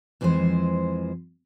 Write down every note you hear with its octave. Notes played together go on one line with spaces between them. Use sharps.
F2 E3 F3 G#3 C5